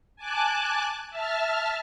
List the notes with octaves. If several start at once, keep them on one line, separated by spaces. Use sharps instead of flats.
G#5 A5 D6 F#6
E5 A5 F6